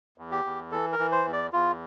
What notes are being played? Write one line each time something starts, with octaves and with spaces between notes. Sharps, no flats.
E2
G4
E2
E3 A4
A#4
E3
C5
E2
D5
E2 F4